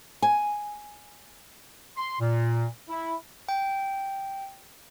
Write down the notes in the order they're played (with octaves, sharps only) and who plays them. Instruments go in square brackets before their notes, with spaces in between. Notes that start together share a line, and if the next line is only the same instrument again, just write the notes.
[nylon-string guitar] G#5
[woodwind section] C6
A#2
E4
[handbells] G5